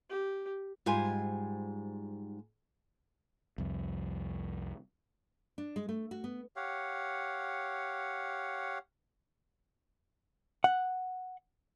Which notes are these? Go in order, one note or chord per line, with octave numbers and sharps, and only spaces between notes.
G4
G#2 G3 F4 C5 G#5
C2 F2
D4
G#3
A3
F#4
B3
G4 C#5 F5 F#5
F#5